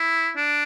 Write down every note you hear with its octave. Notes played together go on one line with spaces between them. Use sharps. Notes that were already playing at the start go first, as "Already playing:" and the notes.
Already playing: E4
D4